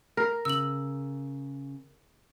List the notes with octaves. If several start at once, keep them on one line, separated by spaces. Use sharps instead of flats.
A#4
C#3 E6 F#7